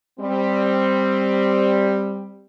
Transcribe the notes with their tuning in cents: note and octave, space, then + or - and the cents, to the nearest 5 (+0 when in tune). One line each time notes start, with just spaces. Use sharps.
G3 +10 C4 +0